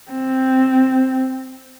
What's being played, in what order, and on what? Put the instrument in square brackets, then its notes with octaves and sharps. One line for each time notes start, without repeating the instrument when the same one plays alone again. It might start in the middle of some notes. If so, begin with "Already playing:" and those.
[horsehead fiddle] C4